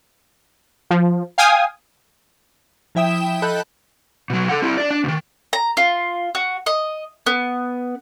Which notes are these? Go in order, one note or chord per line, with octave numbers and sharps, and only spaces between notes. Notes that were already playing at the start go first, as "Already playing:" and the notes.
F3
F5 G5 G#5 D#6
F3 E4 E5 G5 D#6 E7
A4 D#5 A5 B5 F#6 G6
B2 F#3
A4 F#5
C4 E4
D4 D5
D4
D2 D#3
A#5
F4
F#4
D#5
B3